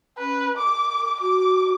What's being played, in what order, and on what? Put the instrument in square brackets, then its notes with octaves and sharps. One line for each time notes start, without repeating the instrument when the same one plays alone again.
[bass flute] C#4 [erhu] B4
[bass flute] A#4 [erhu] D6
[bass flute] F#4 [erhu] D6